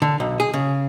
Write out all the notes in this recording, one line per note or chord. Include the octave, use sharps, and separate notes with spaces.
D3
B1
G#4
C#3